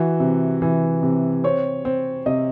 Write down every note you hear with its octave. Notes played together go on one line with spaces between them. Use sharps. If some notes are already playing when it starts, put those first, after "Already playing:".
Already playing: E3 F#4
C3
E3
C3
C4 C#5
C4
C3 D#5